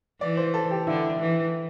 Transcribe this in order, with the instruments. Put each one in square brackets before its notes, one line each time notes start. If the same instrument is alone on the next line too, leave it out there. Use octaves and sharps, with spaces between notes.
[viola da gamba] E3 [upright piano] D5
[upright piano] C5
A4
G4
[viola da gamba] D3 [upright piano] E4
[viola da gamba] E3